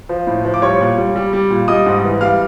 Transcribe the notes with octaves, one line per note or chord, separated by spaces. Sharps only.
F3
A2
F3
D6
G3 C#5 C#6
A#2
G3
G3
G3
A#2
G3 D#5 D#6
G#2
E3
G3 F5 F6